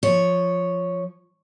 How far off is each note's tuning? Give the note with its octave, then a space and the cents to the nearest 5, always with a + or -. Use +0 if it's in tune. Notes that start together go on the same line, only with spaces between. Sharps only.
F3 +0 C#5 +0